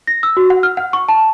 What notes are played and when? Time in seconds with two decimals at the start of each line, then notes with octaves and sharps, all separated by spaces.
0.07 A#6
0.23 E6
0.37 F#4
0.50 F#5
0.63 F6
0.77 F#5
0.93 C#6
1.08 A5